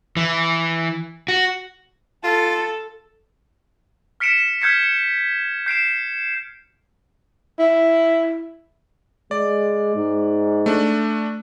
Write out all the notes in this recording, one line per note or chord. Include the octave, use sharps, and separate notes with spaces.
E3
F#4
F4 A4
F6 B6 C#7 D7 E7
F6 G6 G#6 B6 C#7
C#7
G6 C7 D7 E7
E4
G#3 D5
G#2
A3 D4